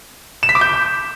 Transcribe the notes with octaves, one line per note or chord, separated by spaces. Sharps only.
E7
B6
D6
G6